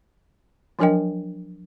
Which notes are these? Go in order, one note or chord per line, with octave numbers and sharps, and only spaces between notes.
F3 F#3 D4 A#4 D#5 G5